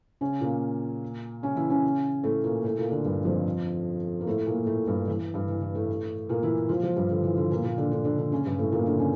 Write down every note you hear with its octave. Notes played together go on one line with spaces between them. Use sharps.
C#3 C#4
A#2 A#3
C#3 C#4
E3 E4
C#3 C#4
A2 A3
A#2 A#3
A2 A3
A#2 A#3
D3 D4
G2 G3
F2 F3
A#3
A2 A3
A#2 A#3
A2 A3
G2 G3
E3
G2 G3
E3
E3
A2 A3
A#2 A#3
E3 E4
F3 F4
F3 F4
G2 G3
D3
E3
D3
A#2 A#3
A#2 A#3
D3 D4
D3 D4
D3 D4
D3 D4
C#3 C#4
G2 G3
A2 A3
A#2 A#3
D3 D4
C#3 C#4